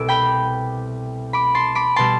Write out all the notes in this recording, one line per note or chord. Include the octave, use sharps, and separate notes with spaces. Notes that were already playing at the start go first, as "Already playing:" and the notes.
Already playing: C2 B2 A3 D6 E6
G5 B5
B5 D6
A5 C6
B5 D6
B2 G3 A5 C6